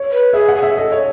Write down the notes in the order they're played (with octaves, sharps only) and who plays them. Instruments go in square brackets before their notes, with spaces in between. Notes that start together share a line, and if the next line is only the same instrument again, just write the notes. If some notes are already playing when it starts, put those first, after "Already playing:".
Already playing: [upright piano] C#5
[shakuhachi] B4
[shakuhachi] G#4 [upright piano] E5
[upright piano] F#5
[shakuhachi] G#4
[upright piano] E5
[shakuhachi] A4 [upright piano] D#5
[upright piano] C#5